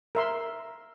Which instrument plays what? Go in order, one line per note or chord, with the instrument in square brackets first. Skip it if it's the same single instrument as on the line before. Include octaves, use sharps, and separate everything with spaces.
[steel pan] A#4 E5 C6